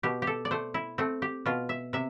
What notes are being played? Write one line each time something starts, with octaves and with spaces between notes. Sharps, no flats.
B2 G4
G4
A4
D5
A3 C5
E4
A3 C4
G4
B2 F4
E5
C3 E5